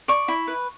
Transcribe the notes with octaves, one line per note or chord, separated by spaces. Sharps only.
D5 C#6
E4
B4